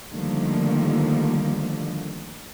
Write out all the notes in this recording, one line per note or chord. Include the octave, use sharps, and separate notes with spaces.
D3 D#3 F3 G3 A3 A#3